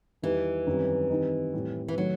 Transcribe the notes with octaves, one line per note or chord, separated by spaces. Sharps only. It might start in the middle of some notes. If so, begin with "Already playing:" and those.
E2 D#3 E3 G3 D#4 G4
F#2 D#3 G3 C4
D#3 G3 C4 D#4
A2 G3 C4
E3
D#3 F#3 A3